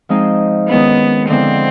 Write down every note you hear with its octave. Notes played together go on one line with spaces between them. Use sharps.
F3 G#3 C4 D#4
D#3 G#3 B3 C#4 E4
D3 F3 G#3 B3 C4 E4